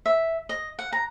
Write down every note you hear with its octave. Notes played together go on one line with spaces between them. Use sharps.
E5
D#5
F#5
A#5